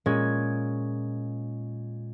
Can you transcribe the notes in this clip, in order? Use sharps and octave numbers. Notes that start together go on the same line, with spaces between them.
A#2 G#3 C#4 G#6